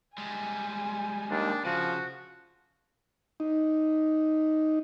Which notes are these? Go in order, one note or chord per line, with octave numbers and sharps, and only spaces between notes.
G3 G#3 G#5
D#2 D4
C#3 F3 F#4
D#4